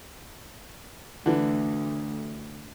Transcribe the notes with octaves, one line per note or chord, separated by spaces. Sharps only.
D2 D3 E3